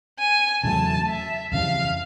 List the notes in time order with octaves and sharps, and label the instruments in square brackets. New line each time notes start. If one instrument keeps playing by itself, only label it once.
[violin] G#5
[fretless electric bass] E2 C#3 F#3 A3 [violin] A5
[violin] E5
[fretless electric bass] F2 C#3 E3 G3 [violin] F5